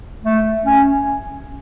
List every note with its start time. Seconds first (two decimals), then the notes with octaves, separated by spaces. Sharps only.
0.24 A3
0.65 C#4